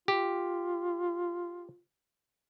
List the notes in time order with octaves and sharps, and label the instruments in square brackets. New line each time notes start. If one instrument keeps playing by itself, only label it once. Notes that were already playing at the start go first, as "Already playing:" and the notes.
[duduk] F4 [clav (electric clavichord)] G4